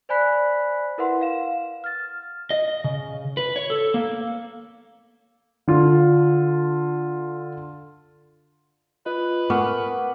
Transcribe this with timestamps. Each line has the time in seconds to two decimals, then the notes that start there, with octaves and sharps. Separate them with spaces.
0.09 C5 D5 G#5 B5 F#6 B6
0.98 E4 A#4 B4 E5 F#5 C6
1.21 F5 E7
1.84 F6 A6
2.50 D#5
2.84 C#3
3.37 B4
3.56 C#5
3.70 A4
3.94 A#3
5.68 D3 F4
9.06 F4 B4 D#5
9.50 B3 A#4 F#5 G#5 C#6 D6 F6